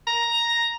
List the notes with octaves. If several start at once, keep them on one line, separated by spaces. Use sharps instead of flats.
A#5